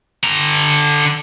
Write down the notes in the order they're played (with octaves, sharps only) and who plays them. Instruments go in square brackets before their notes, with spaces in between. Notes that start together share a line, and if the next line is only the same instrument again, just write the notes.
[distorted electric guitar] D3 A#5